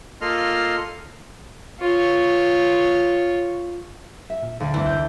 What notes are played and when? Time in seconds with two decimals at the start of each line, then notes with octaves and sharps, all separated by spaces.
0.21 A#3 F4 A4 D#5 C6 F6
1.80 F4 C#5
4.30 E5
4.43 A#2
4.60 D2 F5
4.74 G2 E3 A3 C4
4.86 C2 D#3 G6